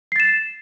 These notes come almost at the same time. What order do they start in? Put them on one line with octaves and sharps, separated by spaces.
C7 A6 E7